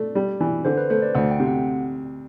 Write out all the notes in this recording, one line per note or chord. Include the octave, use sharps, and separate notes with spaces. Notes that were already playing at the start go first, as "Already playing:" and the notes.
Already playing: A3 D5
G3
E3
D3 C5
B4
A3 C5
D5
D2 F#5
G5
C3
F#5